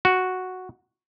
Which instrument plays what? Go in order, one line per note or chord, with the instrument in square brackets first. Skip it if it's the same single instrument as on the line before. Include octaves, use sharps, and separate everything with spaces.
[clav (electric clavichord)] F#4